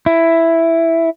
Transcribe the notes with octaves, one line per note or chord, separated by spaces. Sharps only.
E4